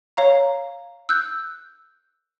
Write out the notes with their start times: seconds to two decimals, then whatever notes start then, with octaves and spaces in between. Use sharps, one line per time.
0.17 C#5 F5 A#5
1.09 E6 F#6 G6